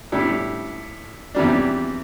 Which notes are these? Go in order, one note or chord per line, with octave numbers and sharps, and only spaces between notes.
A2 G3 D4
E2 C3 G3 D4